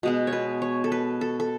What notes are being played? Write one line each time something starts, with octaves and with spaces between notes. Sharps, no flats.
B2 G#3 B3
C#5
B4
C#5
A4
B4
A4
A4